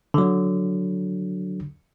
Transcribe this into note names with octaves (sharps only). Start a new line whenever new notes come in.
D3 F#3